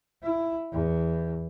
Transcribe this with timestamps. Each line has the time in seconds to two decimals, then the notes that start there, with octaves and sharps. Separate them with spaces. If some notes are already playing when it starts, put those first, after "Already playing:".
0.23 E4
0.72 E2